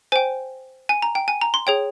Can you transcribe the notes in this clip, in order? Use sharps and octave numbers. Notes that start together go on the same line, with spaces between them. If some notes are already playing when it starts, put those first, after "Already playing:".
C5 G5 G#5
G#5
A#5
G5
G#5
A#5
C6
G#4 C#5 G5